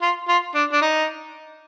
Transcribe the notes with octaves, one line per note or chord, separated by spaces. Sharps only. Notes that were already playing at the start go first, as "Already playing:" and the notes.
F4
F4
D4
D4
D#4